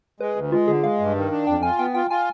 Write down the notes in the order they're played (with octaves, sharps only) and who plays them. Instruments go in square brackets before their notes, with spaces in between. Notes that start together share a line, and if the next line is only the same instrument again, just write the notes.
[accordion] G#3 [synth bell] B4
[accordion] D2
[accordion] G#3 [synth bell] F4
[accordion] D3 [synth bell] G#4
[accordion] G#3 [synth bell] F5
[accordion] G2
D#3
D4
[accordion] F2 [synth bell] G5
[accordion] F4 [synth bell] G#5
[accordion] B3 [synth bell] G5
[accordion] F4 [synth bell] G5
[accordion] F4 [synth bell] G#5